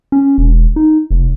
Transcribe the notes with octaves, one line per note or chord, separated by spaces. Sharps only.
C#4
E1
D#4
F1